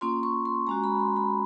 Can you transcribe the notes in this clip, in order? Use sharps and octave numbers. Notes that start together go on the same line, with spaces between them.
A#3 C#4 F4 C6
C#6
C6
G#3 C#4 F#4 A#5
B5
C6
B5